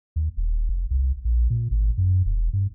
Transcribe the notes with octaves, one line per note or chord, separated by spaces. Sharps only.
D#2
D#1
F1
C2
A#1
A#2
G#1
F#2
E1
G2